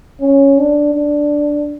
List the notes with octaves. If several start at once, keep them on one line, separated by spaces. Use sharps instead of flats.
C#4
D4
D4